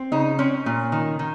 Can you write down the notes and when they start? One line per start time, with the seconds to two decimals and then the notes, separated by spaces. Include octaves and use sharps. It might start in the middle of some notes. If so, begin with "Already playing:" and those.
Already playing: C4
0.12 C#3 D#4
0.39 C4 C#4
0.66 A#2
0.92 D#3
1.19 D#3